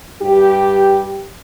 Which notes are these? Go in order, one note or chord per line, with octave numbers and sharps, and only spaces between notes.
G2 G4